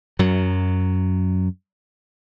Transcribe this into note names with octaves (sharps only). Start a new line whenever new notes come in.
F#2 F#3